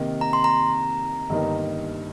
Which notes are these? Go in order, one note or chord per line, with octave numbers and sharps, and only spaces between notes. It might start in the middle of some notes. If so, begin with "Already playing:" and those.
Already playing: C3 D#3 A#3
A#5
C6
A#5
G1 G2 D#3 A#3 D#4